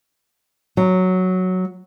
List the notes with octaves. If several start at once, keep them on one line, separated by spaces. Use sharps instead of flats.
F#3